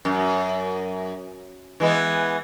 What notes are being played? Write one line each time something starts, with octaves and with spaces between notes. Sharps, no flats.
F#2
E3 G#3 B3